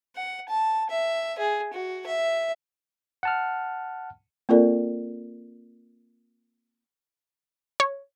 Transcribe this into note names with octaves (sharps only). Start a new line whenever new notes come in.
F#5
A5
E5
G#4
F#4
E5
F#5 A5 F6
A#3 C4 F4 A4 A#4 D5
C#5